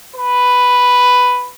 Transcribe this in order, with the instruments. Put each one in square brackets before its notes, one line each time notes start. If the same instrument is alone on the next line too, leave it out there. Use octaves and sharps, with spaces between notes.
[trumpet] B4